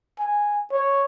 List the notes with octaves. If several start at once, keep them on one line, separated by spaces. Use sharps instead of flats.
G#5
C#5